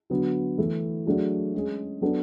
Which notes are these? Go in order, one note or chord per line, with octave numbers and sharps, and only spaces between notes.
D3 F#3 B3 F#4
E3 A3 E4
F#3 A3 D4 G#4
G#3 C#4 G#4
F#3 B3 D4 F#4 A4